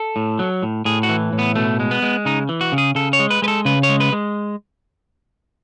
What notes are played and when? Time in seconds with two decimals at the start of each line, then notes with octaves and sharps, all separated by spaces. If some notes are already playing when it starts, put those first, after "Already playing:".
Already playing: A4
0.16 A2
0.39 F#3
0.63 A2
0.85 A2 G#4
1.03 F#4
1.09 E3
1.33 A2
1.39 B3
1.55 B2 A3
1.80 G#3
1.91 B3
2.02 G#3
2.25 C#3 D#4
2.49 E3
2.61 F#4
2.72 C#3
2.78 G#4
2.95 C#3 A4
3.13 C#5
3.19 G#3
3.30 B4
3.42 G#3 B4
3.48 A4
3.65 C#3 B4
3.83 C#5
3.89 G#3
4.00 B4
4.12 G#3